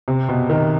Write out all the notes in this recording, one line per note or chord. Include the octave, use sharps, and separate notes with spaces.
C3
B2
D#3